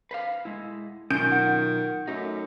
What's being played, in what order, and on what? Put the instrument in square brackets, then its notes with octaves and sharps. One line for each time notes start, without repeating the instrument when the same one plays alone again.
[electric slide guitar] B4 C5 F5
G#3 E4
[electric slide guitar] B2 F#3 F4 [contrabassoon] D#3 [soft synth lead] C#4 [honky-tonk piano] G6 D7
[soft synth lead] F#5
[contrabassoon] F#2 [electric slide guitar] A3 D#4